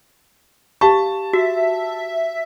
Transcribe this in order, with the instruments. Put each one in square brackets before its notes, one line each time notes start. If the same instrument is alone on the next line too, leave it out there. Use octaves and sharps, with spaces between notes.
[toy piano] G4 F5 C#6 [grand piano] A5
[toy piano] F#4 [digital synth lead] E5